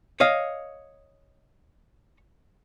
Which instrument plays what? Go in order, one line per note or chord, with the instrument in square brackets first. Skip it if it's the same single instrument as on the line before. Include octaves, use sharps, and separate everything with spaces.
[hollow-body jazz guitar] C#5 D#5 F5